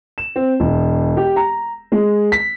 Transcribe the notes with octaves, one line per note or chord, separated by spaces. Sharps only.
E7
C4
E1
G4
A#5
G#3
B6